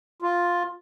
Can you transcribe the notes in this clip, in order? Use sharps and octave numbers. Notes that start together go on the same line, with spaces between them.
F4